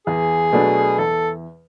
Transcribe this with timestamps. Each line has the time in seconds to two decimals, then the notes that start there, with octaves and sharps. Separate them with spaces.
0.07 E2 G#4
0.52 B2 F#3 A3 D4
0.98 E2 A4